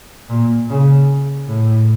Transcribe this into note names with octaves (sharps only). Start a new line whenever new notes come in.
A#2
C#3
A2